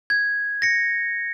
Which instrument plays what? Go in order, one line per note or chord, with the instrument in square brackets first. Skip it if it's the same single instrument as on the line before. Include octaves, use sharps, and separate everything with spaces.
[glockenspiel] G#6
A#6 C#7